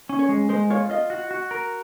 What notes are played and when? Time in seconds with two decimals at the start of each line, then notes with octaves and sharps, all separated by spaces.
0.09 C#4
0.19 C#5
0.29 G#3
0.49 G#3 C5
0.70 F4 C#5
0.90 F4 D#5
1.10 F#4
1.31 F#4
1.51 A#4